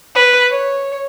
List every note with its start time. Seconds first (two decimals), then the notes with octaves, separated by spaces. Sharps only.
0.15 B4
0.51 C#5